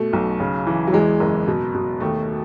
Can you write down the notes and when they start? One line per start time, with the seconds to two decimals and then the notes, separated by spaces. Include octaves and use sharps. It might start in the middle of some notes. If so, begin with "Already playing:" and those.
Already playing: B2 A3
0.13 B1
0.40 C#3
0.67 E3
0.87 F#3
0.93 E2 G#3
1.20 F#1
1.48 B2
1.75 B2
2.00 D#2 A3